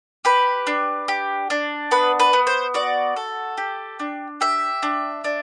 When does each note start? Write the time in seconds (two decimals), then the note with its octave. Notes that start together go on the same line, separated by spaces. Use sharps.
0.25 G4 B4
0.67 D4
1.08 G4
1.50 D4
1.91 B3 B4
2.19 B4
2.33 B3
2.47 C5
2.74 F#4 D5
3.16 A4
3.57 G4
3.99 D4
4.41 G4 E5
4.83 D4
5.24 D4